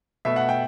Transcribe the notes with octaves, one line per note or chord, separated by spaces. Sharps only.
B2 A3 E5
F#5
G5